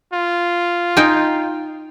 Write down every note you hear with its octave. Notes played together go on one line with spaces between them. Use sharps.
F4
D#4 G5 G#5